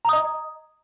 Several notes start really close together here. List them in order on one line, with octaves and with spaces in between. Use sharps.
A#5 D#6 D#5